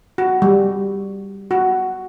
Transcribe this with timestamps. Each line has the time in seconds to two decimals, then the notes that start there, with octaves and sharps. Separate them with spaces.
0.18 F#4
0.42 G3
1.51 F#4